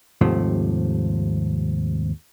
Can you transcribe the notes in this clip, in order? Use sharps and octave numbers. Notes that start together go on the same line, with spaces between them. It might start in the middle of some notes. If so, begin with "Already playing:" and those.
D#2 G#2 C3 F3 A3